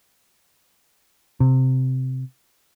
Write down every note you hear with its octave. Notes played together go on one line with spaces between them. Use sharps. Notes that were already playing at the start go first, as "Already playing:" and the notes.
C3